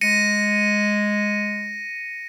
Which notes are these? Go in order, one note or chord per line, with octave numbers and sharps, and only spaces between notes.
G#3 A#6 C#7 D#7